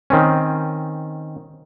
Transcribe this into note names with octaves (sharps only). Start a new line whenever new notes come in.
D#3 C4 C#4